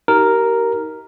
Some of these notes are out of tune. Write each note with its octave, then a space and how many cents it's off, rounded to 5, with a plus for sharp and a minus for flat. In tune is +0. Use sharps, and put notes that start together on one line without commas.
D#4 +25 G4 -30 A#4 +0